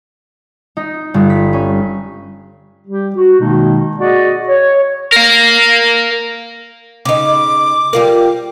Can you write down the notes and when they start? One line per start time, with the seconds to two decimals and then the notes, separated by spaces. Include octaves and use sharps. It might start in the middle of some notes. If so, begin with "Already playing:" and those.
0.77 D#4
1.14 G1
1.30 B6
1.53 C#4
2.88 G3 G4
3.16 F#4
3.39 B2 D#3 G#3 A#3 D#4
3.98 F#4 G#4 D5 D#5 F#5
4.48 C#5
5.12 A#4 F5
7.05 C#3 D#4 D6
7.93 G3 F4 A#4